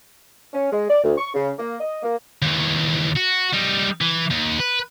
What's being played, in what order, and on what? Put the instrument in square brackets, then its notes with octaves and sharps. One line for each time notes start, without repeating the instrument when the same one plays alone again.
[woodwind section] C#4
G#3
D5
D2
C#6
C#3
A#3
D#5
A#3
[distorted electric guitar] D#2 E3
F#4
G3 D#4
E3
D#2
B4